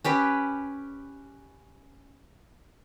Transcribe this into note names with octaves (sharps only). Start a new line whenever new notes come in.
C#4 G4 B4